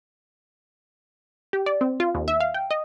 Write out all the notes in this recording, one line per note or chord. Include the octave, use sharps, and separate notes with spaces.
G4
D5
C4
F4
D#2
E5
F5
G5
D#5